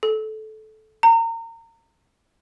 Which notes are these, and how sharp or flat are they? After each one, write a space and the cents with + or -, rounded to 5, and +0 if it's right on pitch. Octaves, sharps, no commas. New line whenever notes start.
A4 -20
A#5 -30